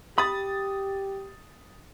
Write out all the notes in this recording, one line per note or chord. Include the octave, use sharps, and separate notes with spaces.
G4 B5 D#6 A6